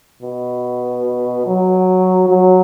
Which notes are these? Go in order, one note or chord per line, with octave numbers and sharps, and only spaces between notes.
B2
F#3
F#3